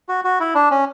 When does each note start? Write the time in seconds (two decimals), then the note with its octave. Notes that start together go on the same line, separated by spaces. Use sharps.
0.09 F#4
0.25 F#4
0.40 E4
0.55 D4
0.71 C#4